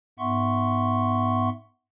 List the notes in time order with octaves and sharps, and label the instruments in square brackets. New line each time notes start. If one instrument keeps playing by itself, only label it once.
[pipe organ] G#2 B3 E5 F#5 C6 C#6